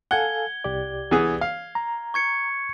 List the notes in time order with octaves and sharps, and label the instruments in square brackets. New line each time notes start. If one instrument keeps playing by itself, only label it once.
[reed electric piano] A4 F5 G#5 [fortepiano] F#5 [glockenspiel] G#6 G7
[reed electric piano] C2 G4 D5
[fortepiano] E3 B3 G#4
F5
[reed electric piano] A#5
[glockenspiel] C#6 G#6 C#7